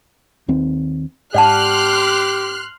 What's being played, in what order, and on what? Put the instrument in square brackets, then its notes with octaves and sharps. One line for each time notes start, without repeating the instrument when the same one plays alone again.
[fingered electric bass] D#2 D#3 C4
[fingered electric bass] G#2 [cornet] G4 [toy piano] D5 F#5 A5 [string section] C6 F6 F#6